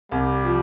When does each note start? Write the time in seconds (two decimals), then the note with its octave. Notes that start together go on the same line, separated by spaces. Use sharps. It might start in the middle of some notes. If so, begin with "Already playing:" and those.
0.12 C2 G3
0.45 F3